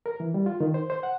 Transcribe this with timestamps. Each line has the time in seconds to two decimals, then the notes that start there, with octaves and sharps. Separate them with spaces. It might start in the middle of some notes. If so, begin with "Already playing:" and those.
0.06 A#4
0.20 E3
0.34 G3
0.46 F4
0.60 D#3
0.74 C5
0.90 C5
1.03 F#5